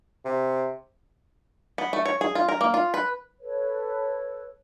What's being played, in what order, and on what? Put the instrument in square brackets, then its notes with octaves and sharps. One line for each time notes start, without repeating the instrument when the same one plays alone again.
[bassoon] C3
[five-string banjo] B3
A3
C#5
G#4
F4
A#4
A#3
F4
B4
[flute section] A4 B4 C#5